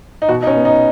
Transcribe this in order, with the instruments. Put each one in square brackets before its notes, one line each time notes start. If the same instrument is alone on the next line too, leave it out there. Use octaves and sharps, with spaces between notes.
[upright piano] D#4
B2 F#4
D#4
C#4
B3
D#4